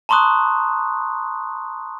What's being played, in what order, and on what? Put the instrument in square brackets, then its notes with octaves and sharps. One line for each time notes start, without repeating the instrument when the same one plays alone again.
[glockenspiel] A5 A#5 C6 C#6 D#6 F#6